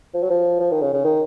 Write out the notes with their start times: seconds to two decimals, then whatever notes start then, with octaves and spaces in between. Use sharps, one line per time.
0.14 F3
0.23 F#3
0.30 F3
0.60 F3
0.71 D#3
0.82 C#3
0.94 C#3
1.04 D#3